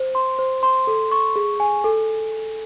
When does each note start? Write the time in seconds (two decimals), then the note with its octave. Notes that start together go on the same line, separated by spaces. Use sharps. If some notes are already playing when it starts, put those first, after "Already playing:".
Already playing: C5
0.15 C6
0.39 C5
0.63 C6
0.87 A4
1.12 C#6
1.36 G#4
1.60 G#5
1.84 A4